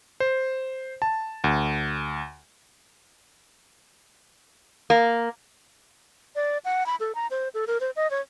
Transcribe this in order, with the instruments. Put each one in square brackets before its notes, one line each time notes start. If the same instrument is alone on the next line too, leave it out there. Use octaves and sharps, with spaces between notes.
[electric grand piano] C5
A5
D2
[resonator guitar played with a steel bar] A#3
[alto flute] D5
F#5
B5
A4
A#5
C5
A4
A#4
C5
D#5
C#5